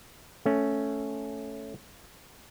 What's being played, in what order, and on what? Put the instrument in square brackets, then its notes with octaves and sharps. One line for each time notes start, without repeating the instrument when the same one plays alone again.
[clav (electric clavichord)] A3 C#4